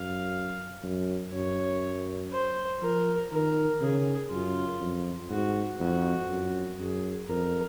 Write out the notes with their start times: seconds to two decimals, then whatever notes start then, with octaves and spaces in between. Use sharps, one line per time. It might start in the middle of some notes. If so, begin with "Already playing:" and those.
Already playing: F#2 F5
0.83 F#2
1.33 F#2 C#5
2.32 C5
2.82 F3 A#4
3.31 D#3 A#4
3.81 C#3 G#4
4.30 F#2 F4
4.81 F2
5.30 G#2 F#4
5.80 F2 F#4
6.30 F#2
6.79 F#2 G#4
7.28 F2 A#4